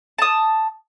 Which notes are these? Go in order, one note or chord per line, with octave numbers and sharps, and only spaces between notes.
A5 D#6